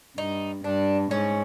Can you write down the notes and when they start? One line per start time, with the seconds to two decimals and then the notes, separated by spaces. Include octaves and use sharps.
0.17 G2 D#4
0.64 G2 D4
1.11 G#2 C#4